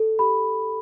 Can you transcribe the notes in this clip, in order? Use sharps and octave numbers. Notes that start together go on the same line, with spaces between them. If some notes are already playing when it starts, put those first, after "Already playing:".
Already playing: A4
G4 B5